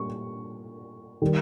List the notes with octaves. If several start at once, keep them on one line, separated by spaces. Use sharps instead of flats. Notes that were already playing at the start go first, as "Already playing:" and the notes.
Already playing: A#2 G3 C#6
D#3 G3